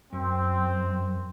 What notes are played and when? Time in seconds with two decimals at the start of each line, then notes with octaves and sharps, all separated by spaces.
0.13 F#2 C4